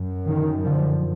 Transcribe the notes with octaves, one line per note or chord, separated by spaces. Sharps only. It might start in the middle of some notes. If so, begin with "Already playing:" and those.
Already playing: F#2
D#3
D3 F3